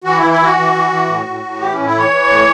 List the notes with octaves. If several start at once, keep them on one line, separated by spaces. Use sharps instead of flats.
E3 F#4
E3 E4
E4
E3 F#4
E3
E3
E3
A2
A2
A2
E3 G4
A2 C#4
E4
E3 C#5
E3
A2